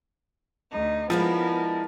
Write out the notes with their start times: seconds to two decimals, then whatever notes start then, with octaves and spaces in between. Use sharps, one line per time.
0.71 D2 D#4
1.10 F3 G#3 B3 D4 E4 A#4